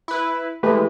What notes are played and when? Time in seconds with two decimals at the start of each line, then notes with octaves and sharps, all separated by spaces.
0.08 E4 B4
0.63 E3 G#3 A3 G4 B4